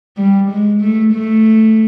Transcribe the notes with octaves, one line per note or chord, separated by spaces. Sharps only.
G3
G#3
A3
A3